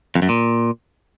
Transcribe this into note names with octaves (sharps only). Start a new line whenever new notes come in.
F2
F#2
A#2